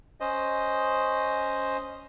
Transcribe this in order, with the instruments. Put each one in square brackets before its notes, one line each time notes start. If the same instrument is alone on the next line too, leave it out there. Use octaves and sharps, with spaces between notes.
[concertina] C#4 C5 D#5